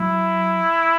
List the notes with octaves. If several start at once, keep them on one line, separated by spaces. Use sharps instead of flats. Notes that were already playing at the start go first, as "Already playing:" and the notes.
Already playing: F#3 E4